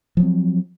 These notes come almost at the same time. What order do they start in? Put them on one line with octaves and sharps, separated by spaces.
F3 F#3 C4